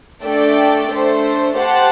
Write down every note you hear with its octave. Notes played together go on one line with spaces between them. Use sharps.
A3 D4 A4 D5 G5
A3 D4 A4 C5
G4 C5 F#5 A5